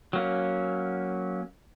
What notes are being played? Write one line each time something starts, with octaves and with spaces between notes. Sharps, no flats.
F#3 A#3 C#4